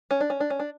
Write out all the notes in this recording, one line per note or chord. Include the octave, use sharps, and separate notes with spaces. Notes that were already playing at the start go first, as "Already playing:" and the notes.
C#4
D4
C#4
D4
C#4
D4